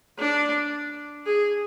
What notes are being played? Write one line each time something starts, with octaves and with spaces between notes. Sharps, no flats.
D4
G#4